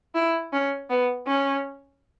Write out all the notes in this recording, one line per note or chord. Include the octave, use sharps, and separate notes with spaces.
E4
C#4
B3
C#4